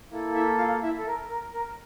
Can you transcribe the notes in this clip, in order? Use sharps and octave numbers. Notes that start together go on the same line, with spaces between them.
A#3 E4 A4
E4 E5
F4 F5
E4 E5
A4
A#4
A#4
A#4